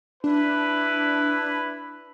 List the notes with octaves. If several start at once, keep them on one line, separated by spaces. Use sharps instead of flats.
D4 E4 B4